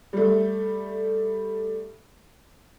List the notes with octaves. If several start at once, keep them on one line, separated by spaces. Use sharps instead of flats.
G3 A3